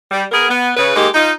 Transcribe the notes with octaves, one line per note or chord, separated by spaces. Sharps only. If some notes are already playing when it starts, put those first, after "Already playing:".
G3
B3 G#4 A#4
B3
C#3 B4
G#3 A#3 D#4 G4
D#4 F4